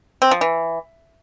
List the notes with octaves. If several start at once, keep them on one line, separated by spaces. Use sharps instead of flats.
C4
F3
E3